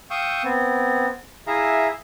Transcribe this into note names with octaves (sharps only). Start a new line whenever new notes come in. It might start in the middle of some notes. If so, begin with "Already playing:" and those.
F5 G5 C#6 D#6 E6 G6
B3 C4
E4 G#4 E5 F5 A#5